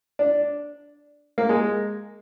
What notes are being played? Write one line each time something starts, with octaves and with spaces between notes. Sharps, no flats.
D4
A#3
G#3